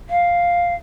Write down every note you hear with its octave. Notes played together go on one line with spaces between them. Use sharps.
F5